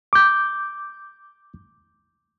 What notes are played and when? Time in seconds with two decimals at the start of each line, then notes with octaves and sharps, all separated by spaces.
0.13 D6 G6